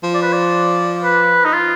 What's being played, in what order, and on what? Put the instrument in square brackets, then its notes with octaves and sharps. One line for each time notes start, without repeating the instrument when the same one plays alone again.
[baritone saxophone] F3
[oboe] D5
B4
D5
B4
D#4
F4